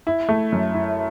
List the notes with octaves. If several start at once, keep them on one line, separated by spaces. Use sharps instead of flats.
E4
A3
F#2
E4